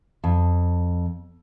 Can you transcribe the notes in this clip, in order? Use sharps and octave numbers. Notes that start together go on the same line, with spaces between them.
F2